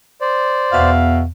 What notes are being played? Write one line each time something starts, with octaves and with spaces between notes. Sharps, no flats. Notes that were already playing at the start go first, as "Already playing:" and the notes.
C5 D5
E2 B2 E5 F5